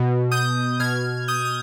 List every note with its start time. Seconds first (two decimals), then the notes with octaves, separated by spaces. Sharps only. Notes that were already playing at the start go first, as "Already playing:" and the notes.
Already playing: B2
0.31 D#6 G6
0.80 B2 F6 G#6
1.28 D#6 G6
1.45 D#6